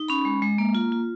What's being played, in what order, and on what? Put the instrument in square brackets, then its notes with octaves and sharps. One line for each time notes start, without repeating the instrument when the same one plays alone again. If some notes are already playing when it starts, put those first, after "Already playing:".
Already playing: [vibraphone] D#4
C#4 B5
G#3
G#3
A#3
F4
F4